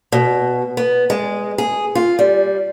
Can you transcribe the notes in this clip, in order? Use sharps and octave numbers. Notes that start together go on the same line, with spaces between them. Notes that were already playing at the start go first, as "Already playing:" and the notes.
B2
B3
G#3
G#4
F4
G3